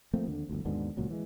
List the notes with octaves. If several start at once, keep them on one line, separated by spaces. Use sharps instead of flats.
F3 A3 A#3 C4
D#2 D3
G1 D2
D#2 G#2 B2 D3
D#1 C#2 A#2 F#3
E3 G#3